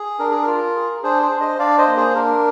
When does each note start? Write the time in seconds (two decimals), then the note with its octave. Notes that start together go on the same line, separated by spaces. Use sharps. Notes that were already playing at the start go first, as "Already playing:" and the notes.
Already playing: G#4
0.19 D4 A#4
0.31 G#4
0.42 F4 A#4
0.76 G#4
1.03 D4 G#4 C5
1.22 G#4 C5
1.32 D4
1.40 C5 D#5
1.59 D4 D5 F5
1.78 C5 D#5
1.87 A#3
1.96 G#4 C5
2.15 D4 A#4